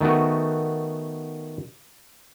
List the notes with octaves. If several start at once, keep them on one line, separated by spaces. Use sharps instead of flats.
D#3 A3 B3 F#4